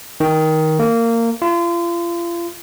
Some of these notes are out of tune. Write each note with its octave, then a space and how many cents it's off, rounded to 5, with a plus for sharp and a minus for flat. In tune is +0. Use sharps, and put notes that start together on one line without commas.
D#3 +15
A#3 -20
F4 -35